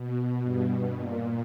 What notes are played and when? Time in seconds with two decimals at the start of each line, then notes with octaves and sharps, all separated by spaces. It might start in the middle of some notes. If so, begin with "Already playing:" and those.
Already playing: B2
0.43 G2
0.93 A#2